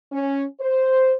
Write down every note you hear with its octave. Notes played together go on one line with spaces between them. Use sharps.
C#4
C5